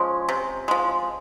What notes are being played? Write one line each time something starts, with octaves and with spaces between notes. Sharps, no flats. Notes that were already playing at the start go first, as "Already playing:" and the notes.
Already playing: F3 G#3 C#4
C3
F3 G#3